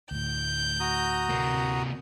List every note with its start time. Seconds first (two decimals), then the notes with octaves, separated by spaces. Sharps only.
0.11 D2 A2 G6
0.80 F#4 A#5 D#6
1.30 C3 A#3